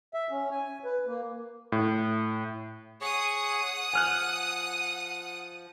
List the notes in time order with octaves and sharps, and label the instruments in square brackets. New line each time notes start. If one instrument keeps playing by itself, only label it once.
[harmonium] E5
C#4
G#5
B4
A#3
[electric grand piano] A2
[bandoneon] G#4 C#5 C#6 [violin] F#5 D#6
[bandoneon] F3 [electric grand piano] G#5 F6 F#6